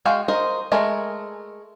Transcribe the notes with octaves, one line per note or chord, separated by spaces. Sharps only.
G#3 F#4 F5 G5
A#4 C5 D#5
G#3 A3 A#4